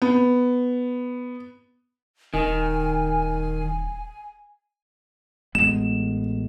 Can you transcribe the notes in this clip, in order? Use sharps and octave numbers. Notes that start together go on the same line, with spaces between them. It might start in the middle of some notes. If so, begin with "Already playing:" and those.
B3
D#1 D#3 G#5
A1 G#3 B3 E7